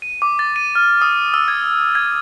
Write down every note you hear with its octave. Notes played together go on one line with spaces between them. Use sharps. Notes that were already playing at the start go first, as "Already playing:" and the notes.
D#7
D6
A6
D#7
F6
D#6
E6
G#6
G#6